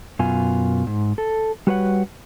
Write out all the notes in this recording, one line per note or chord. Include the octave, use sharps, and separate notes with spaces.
F#2 B2 F4 G#5
G#2
A4
G3 F#4 B4 C#5 F#5